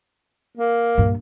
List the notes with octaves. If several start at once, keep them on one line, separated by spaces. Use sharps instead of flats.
A#3
G2 A#2